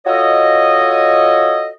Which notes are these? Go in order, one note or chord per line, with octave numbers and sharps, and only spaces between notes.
F4 F#4 A4 C#5 D#5